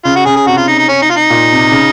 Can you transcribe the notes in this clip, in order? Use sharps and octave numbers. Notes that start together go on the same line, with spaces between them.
C#3 F4
F#4
C#3 G#4
G#4
C3 F#4
F4
D#4
D#4
C#4
D#4
F4
D#4
A#2
C3
C#3